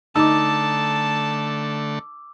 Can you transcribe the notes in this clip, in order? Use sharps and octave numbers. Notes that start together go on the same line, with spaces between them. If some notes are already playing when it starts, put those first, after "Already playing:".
D3 A3 D#4 A5 D6 E6